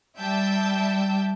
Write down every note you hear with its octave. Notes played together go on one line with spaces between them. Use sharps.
G3 E5 G5 A5 G6